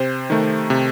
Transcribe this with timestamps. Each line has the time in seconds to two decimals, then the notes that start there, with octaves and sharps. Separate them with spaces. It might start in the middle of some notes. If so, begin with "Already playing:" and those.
Already playing: C3 C5
0.30 D#3 A3
0.70 C3